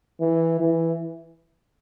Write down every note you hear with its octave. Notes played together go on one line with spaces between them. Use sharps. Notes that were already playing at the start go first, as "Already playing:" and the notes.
E3
E3